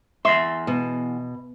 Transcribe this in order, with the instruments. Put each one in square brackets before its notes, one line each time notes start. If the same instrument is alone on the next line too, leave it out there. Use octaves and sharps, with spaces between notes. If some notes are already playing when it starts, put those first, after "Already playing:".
[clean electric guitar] E2 C6 [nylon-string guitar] E5
[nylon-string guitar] B2